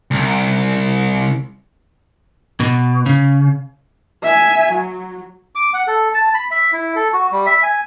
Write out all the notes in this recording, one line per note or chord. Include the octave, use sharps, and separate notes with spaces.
C2
B2
C#3
E5 G#5
F#3
D6
F#5
A4
A5
B5
E5
E4
A4
F#4
G3
E5
G#5